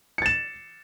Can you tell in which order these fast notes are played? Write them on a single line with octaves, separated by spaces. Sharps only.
C#7 A6 E7